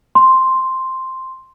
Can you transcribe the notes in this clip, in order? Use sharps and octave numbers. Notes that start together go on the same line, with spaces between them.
C6